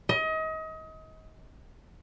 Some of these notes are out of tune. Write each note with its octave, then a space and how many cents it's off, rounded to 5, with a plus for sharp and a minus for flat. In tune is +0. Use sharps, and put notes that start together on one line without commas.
D#5 +30